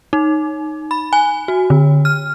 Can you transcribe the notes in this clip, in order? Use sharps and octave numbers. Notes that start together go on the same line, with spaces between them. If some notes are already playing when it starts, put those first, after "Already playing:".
D#4
B5
G#5
F#4
D3
F6